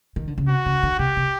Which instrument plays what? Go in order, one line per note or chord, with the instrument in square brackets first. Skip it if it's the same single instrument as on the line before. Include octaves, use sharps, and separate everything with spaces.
[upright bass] D#3
D3
C#3
[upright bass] C3 [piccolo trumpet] F#4
[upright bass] C#3
D3
[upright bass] C3 [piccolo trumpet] G4
[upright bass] C3